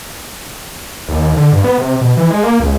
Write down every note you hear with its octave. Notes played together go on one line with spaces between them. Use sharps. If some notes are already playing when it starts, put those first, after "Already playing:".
D#2
D3
G2
B3
C3
B2
E3
G#3
A#3
C#2